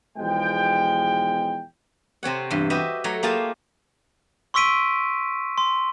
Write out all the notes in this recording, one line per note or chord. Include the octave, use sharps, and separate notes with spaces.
B1 E2 F3 G#3 G5
C3 C4 C#5 F#5
E2 G2
F#4 G4 B4 D#5 E5
F#3 A3 C#5 A#5
A#3 F4 G4 G#4 F5 A5
C6 C#6 E6 B6 D7 D#7
C6